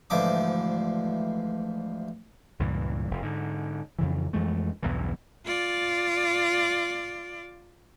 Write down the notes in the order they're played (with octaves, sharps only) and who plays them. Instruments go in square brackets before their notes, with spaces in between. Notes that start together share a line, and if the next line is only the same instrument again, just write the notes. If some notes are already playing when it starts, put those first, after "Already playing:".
[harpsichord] D2 G#2 E3 F3 D6 D#6
[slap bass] C#2 G2 A#2 E3
F1
G#2 D3
F2 C#3 E3
F2 E3 G#3 A3
B1 E2 G2 E3
[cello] F4 D5